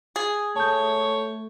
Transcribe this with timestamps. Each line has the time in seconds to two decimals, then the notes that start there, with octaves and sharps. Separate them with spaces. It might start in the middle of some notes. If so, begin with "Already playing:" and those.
0.16 G#4
0.56 A3 C#5 A5 G6